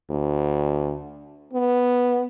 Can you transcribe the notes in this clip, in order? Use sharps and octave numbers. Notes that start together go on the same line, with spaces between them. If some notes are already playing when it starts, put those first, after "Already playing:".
D2
B3